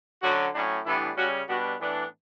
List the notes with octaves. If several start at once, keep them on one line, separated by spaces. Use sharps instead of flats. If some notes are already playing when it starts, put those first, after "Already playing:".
D3 F#3 C#4 F#4
A2 F#3 C#4 D4
A2 E3 G3 B3 D4 E4
C#3 G3 C#4 F#4
B2 G3 B3 D4 F#4
A2 E3 B3 D4